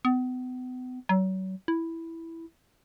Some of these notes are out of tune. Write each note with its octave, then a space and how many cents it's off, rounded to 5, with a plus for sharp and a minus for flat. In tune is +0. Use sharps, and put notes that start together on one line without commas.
B3 +40
F#3 +35
E4 +0